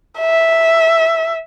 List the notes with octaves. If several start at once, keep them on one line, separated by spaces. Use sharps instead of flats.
E5